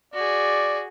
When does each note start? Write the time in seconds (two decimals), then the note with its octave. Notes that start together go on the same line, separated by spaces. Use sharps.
0.14 F#4 G#4 D5